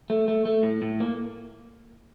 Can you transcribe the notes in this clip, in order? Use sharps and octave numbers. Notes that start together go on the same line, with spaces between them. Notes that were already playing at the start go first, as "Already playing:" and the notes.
A3
A3
A3
A2
A2
A#3